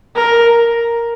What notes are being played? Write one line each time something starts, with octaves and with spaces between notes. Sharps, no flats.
A#4